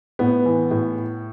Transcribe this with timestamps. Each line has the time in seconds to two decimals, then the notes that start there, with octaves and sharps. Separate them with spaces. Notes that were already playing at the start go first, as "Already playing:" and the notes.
0.19 A2 B3
0.46 E3
0.71 A2